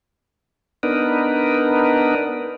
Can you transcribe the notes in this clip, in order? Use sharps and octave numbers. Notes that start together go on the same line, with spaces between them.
B3 D4 D#4 A#4 B4